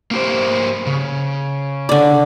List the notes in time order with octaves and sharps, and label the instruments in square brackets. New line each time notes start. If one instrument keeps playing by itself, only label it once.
[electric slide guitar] A#3 G4 C5
C#3
[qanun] D3 D5